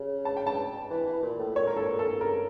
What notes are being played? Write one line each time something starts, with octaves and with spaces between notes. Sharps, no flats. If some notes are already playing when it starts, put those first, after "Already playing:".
Already playing: C#3
A5
G5
A5
E3
E3
A#2
A2
A#2 C#5
A#4
A4
A4
C#3 A#4